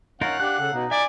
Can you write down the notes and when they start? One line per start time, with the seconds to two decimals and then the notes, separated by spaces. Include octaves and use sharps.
0.21 C#4 D#4 F4 A#4 F#5
0.40 D4 G4 F5 F#6
0.60 C#3 A4
0.73 B2 D#4
0.91 D5 E5 G#5